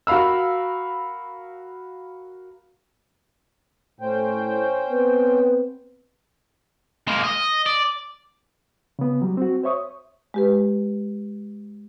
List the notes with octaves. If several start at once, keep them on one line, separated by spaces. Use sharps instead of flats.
F#4 A#4 F5 B5 E6
A2 C#4 C5 G5
B3 C4 B4
G#3 A#3
D#5
D5
C#3 B3
F#3 G3
C4 F#4
C5 C#5 E5 C#6 D#6
G#3 G4 B4